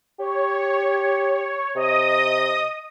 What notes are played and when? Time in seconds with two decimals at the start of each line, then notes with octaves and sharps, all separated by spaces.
0.19 G4 C#5
1.76 C3 D#5 D#6